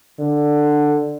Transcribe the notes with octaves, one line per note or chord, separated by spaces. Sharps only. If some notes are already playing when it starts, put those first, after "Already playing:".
D3